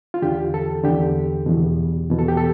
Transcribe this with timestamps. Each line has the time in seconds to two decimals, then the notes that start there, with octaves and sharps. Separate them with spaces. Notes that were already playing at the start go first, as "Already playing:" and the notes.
0.14 F4
0.22 E2 D3 G4
0.54 A4
0.84 E2 D3 G4
1.46 E2 B2
2.09 E2 B2
2.19 A4
2.28 G4
2.37 A4